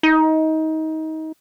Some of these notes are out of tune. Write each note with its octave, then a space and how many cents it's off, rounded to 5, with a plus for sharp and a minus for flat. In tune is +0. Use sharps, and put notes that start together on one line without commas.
D#4 +25